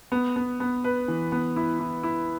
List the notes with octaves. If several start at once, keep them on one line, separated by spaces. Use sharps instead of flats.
B3
B3
B3
B4
E3
B3
E4
E4
E4